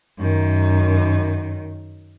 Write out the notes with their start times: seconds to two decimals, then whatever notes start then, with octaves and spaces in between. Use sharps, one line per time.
0.18 F#2 D#3